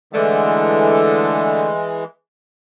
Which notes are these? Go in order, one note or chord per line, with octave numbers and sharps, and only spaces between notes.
D3 E3 G#3 A3